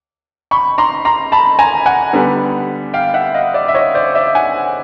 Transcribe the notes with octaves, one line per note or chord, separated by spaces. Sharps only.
B5 C#6
A#5 C6
A#5 C6
A5 B5
G#5 A#5
F#5 G#5
D3 G3 B3
F5 G5
E5 F#5
D#5 F5
D5 E5
E5
C#5 D#5
C5 D5
D5 E5
F#5 G#5